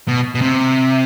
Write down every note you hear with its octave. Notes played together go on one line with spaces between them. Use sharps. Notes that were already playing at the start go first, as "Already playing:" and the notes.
B2
B2
C3